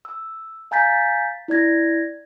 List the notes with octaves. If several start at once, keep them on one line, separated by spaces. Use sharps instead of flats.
E6
F5 G#5 A#5 G6 A6 B6
E4 D5 G#6 A#6